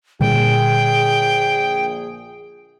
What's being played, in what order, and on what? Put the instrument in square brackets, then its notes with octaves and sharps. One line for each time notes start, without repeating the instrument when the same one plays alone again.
[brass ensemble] A#1 G#4 [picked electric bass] A#2 D3 G3 [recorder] G5